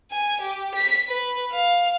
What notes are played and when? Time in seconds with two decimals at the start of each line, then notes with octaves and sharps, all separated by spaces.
0.12 G#5
0.41 G4
0.75 B6
1.08 B4
1.52 F5